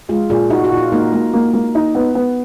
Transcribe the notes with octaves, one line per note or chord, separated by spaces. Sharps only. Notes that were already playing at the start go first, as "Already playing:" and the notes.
G#3 F4
A#2 G#4
D#4 F#4
F#4
A#2
F4
A#3 D#4
A#3
A#3
A#3
D#4
B3
B3